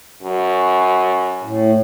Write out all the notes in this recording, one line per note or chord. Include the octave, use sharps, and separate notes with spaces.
F#2
A2